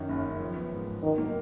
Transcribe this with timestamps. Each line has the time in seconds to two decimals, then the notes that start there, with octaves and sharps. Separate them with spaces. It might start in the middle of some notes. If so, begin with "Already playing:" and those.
Already playing: F#2 D#3
0.09 F#1
0.24 F#1
0.40 F3
0.56 B3
0.71 G#2
0.87 G#2
1.02 D#3 F#3
1.18 A#3